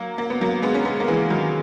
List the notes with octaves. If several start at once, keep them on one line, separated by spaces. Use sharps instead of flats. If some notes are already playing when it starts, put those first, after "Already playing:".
Already playing: F#3 A#3
A#3
B3
F#3 A#3
G#3 B3
C#4
G#3 B3
A#3
E3 G#3
D#3 F#3